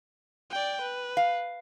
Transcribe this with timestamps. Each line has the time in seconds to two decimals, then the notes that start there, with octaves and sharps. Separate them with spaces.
0.51 D5 G5
0.82 B4
1.17 F5